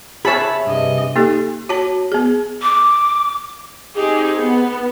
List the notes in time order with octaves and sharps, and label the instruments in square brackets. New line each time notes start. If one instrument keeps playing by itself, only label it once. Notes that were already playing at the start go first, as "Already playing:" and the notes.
[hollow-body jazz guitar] G#4 E5 [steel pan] C#5 A5 B5
[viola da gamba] G2 C3 D#5
[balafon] A#3 D#4 G4 A4
F#4 C#5 A5
B3 G#4
[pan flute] D6
[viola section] C4 D#4 G4 G#4
B3